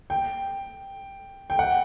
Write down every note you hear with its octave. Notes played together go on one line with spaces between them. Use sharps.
G5
G5
F#5